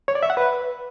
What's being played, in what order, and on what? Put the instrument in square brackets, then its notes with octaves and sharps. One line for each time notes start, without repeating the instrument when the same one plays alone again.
[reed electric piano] C#5
D5
E5
F#5
B4